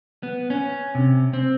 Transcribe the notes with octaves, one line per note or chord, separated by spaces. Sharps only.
B3
C#4
C3
C4